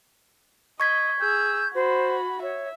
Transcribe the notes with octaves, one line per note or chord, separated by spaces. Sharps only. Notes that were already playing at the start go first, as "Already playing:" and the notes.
D#5 C#6 G#6 B6
G#4 E6 G6
F#4 C5 B5
C#5 E5